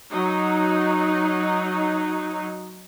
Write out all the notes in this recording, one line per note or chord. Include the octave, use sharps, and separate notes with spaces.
F#3 D#4